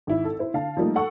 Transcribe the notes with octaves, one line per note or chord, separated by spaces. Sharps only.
G#1 E4
A4
E4 C5
D3 F5 A5
F3 G3 A3 A#3 D#4
A4 F#5 C#6